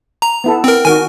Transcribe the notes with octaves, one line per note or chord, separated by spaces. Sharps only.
A#5
B3 E4 A4
C4 A#4
D#3 F#4 A#4 G#5